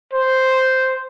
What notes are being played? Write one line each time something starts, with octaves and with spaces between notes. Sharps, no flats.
C5